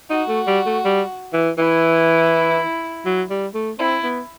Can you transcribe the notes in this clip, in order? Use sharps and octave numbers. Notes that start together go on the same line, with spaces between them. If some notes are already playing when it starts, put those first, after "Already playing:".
D#4 F#4
A3
G3
A3
G3
E3
E3 E4
F#3
G3
A3
C4 E4
B3